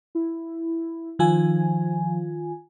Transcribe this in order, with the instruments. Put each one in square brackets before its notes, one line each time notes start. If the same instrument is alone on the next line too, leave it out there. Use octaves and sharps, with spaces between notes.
[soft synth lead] E4
[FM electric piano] D#3 F4 G#5 [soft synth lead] F3